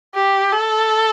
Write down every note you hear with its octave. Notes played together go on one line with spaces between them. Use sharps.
G4
A4